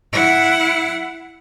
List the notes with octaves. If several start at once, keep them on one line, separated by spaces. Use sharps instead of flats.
E4 F#5